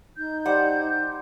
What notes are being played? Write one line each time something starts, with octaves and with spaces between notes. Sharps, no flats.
D#4 G6
G3 C5 F#5